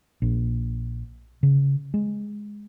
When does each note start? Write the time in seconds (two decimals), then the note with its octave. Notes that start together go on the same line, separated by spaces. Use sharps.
0.22 A#1
1.43 C#3
1.94 G#3